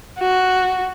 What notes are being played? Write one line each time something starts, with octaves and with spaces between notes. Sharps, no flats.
F#4